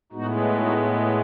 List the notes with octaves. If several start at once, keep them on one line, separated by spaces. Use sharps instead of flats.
A2 G#3 B3 D#4 F#4
D#4 F#4